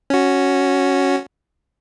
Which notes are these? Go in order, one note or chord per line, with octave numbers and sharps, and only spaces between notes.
C#4 F#4